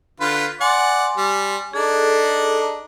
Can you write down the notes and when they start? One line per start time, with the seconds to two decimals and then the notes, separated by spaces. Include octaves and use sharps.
0.20 D3 F4 B4
0.61 D5 F#5 G#5 C6
1.17 G3
1.73 D4 D#4 G#4 A4 D5